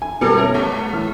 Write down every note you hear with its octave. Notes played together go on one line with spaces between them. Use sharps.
G#5
B2 G3 A3 A4 A#4
C#4 A#4 E5
G#3
A2 E3 F6